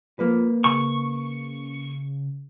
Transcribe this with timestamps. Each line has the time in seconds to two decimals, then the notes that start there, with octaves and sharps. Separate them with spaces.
0.19 F3 A#3 B4
0.64 C#3 C#6